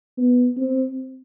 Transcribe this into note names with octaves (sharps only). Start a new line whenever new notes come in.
B3
C4